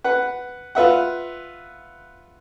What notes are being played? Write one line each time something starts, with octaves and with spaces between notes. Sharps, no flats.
B4 F#5
F4 B4 E5 F#5